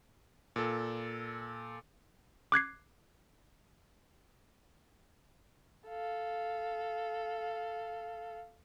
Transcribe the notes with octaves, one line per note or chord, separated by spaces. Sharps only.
A#2 A4
D6 F#6 G#6 C7
A4 F5